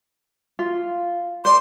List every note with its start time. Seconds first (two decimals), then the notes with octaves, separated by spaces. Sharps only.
0.59 F4
1.45 C5 D5 C6